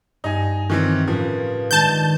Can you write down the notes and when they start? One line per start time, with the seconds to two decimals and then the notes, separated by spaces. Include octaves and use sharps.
0.24 G2 D#4 G#5
0.70 D#3 E3 C4 F4
1.07 A2 C#3 F3 A#4 B4
1.71 D#3 G#3 D4 A5 G6